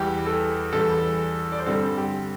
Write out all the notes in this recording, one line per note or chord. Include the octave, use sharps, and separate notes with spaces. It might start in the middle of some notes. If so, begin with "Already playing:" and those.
Already playing: E2 E3 G3 G4
A4
E2 E3 G3 A4
D5
C5
G2 D3 G3 C4 A4
G4